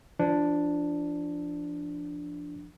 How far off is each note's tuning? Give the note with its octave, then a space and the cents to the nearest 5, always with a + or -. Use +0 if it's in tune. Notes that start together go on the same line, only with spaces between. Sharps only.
F3 -25 D4 +0